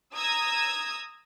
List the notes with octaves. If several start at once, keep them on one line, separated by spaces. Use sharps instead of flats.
A#5 D#6 E6 G#6